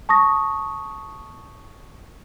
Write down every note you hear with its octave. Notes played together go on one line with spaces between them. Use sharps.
A5 C#6 D#6 A#6